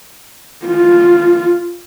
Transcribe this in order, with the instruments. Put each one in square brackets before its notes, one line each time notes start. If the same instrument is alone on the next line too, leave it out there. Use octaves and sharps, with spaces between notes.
[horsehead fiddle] F4